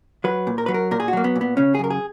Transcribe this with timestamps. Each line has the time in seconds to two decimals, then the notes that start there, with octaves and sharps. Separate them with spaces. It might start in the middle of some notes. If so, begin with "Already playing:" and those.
0.24 F#3 B4
0.47 A#2
0.58 A#4
0.66 F#3 B4
0.74 A#4
0.91 A#2 A#4
1.00 G#4
1.08 F#4
1.13 F#3 A#3
1.24 B3
1.36 A#2
1.41 B3
1.57 C#3 C#4
1.75 G#4
1.79 F#2 A#4
1.90 G#4